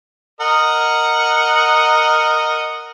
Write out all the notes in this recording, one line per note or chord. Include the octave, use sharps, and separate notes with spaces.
A#4 D#5 F#5